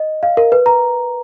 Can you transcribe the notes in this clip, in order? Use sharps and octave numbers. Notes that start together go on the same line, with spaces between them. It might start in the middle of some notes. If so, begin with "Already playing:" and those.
Already playing: D#5
F5
A#4
B4
A#5